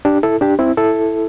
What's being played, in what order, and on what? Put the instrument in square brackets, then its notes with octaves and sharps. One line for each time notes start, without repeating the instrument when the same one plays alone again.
[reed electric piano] D4 G4
E4 A4
D4 G4
C4 E4
E4 A4